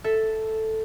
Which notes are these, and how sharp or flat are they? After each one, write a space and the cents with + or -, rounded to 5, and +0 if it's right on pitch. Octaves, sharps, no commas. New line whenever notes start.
A4 +0 E5 +0